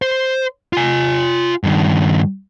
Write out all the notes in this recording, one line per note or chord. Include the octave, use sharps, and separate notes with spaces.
C5
F4 G#5
G2 D#3